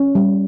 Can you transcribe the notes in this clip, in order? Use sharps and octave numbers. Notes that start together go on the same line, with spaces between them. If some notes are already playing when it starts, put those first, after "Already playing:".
Already playing: C#4
G3